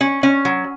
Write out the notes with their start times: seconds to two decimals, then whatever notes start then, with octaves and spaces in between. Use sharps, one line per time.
0.01 C#4
0.23 C#4
0.45 F#3